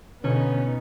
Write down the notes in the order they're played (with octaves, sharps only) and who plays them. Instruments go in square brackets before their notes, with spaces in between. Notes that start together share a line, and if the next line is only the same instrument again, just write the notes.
[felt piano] B2 [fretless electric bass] D3 [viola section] B3 D#4 [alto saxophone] C#4